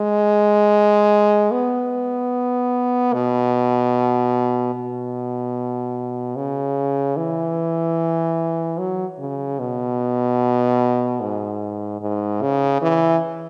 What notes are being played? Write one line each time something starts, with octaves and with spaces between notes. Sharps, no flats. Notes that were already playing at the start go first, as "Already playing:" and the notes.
Already playing: G#3
B3
B2
B2
C#3
E3
F#3
C#3
B2
G#2
G#2
C#3
E3